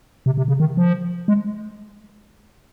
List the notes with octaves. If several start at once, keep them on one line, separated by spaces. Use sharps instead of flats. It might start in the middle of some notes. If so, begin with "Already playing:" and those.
C3
C3
C#3
D#3
F3
G#3